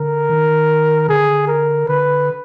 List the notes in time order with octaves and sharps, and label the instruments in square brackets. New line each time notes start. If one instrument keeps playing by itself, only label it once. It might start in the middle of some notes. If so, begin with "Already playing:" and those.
Already playing: [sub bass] D3 [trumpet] A#4
[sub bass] D#3
[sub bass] D3 [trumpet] G#4
[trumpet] A#4
[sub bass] D3 [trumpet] B4